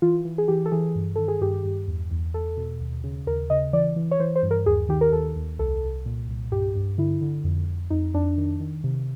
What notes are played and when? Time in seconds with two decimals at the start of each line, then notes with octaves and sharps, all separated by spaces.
0.02 E3 F4
0.25 E3
0.38 G#4
0.48 E3 G4
0.66 A4
0.72 E3 G#4
0.95 G2
1.16 D#3 A4
1.28 G#4
1.41 G2 G4
1.64 G2
1.88 E2
2.11 E2
2.34 E2 A4
2.57 B2
2.81 D#2
3.04 C#3
3.27 D#2 A#4
3.50 C#3 D#5
3.73 E3 D5
3.96 E3
4.11 C#5
4.20 E3 C5
4.36 C5
4.43 G2
4.51 A#4
4.66 D#2 G#4
4.89 D#3 G4
5.01 A#4
5.12 D#2 A4
5.36 D#2
5.59 C2 A4
5.82 C2
6.06 A#2
6.28 C2
6.52 G2 G4
6.75 G2
6.98 D3 E4
7.22 D3
7.44 F2
7.68 F2
7.90 F2 D#4
8.14 F2 D4
8.37 D#3
8.60 D#3
8.84 C3